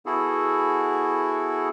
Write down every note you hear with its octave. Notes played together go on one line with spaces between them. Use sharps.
B3 E4 F#4 G#4 A4